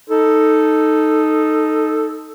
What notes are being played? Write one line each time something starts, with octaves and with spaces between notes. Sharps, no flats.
D#4 A4